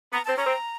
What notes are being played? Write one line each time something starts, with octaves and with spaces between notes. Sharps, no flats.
B3 A#5
C4 A5
C#4 A#5
C4